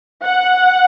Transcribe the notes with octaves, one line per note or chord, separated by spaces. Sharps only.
F#5